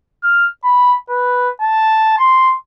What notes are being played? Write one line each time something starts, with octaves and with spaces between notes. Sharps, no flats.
F6
B5
B4
A5
C6